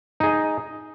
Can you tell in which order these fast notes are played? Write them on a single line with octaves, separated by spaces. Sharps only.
D#4 G#4 D#5